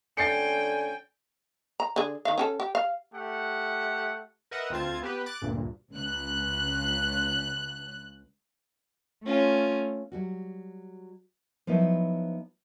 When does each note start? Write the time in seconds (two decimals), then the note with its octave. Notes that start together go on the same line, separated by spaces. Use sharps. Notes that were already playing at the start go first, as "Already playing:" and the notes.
0.17 D3 C#4 G5 G#5 A6 C7 C#7
1.80 A#5
1.96 D3 G#4
2.25 D#3 F5
2.38 C#4 G4 A4
2.60 G4
2.75 F5
3.13 A3 G4 F#5
4.51 A#4 B4 D#5 E5 F#5
4.70 D2 C4 F4 A5 G#6
5.02 B3 G4 B4
5.26 D6 F#6 A6
5.42 D2 G2 A#2
5.92 C#2 F#6
9.23 A3 C#4 F4
10.12 F#3 G3 F#4
11.67 F3 F#3 B3 D#4 E4 B4